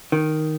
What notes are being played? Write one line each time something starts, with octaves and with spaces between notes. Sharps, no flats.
D#3